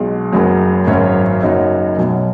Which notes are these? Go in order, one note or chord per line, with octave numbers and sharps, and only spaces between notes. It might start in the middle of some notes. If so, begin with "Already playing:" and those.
Already playing: B1 B2 G#3
F#1 F#2 C#3 F#3
G#1 F#2 F#3 C#4 C#5
F#1 F#2 F#3 D#4
B1 B2 F#3